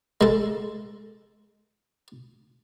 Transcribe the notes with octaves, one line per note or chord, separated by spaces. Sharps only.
G#3 A4